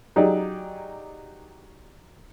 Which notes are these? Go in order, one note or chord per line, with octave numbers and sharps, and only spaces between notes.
F#3 D#4 G4 G#4 D5